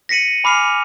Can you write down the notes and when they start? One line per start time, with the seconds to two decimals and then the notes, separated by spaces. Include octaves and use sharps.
0.09 A#6 B6 C#7 D#7 F#7
0.44 G#5 B5 D6 F6 C7 F7